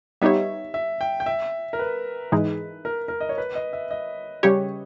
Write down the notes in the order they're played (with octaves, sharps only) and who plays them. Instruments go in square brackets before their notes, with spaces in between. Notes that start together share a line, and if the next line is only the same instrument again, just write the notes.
[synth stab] G3 B3 D#4 G4 C#5 [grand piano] E5
[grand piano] E5
G5
G5
E5
A#4
B4
[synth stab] G#2 E3 G#3 D#4 G#4
[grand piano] A#4
A#4
D#5
C#5
B4
D#5
E5
D#5
[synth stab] C#3 G3 C#4 G4 C#5